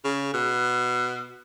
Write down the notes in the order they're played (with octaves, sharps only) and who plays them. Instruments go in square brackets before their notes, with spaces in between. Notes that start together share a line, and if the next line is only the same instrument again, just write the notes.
[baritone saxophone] C#3
B2